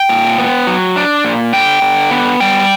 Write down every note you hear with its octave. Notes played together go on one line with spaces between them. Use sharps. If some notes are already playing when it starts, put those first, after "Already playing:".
Already playing: G5
A#2
B3
F#3
D4
A#2
D3 G5
D3
B3
G3 G5